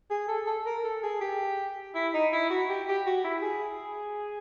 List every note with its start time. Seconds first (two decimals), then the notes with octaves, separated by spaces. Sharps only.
0.10 G#4
0.28 A4
0.46 A4
0.66 A#4
0.84 A4
1.03 G#4
1.21 G4
1.95 E4
2.14 D#4
2.33 E4
2.50 F#4
2.69 G4
2.88 G4
3.07 F#4
3.24 E4
3.43 G#4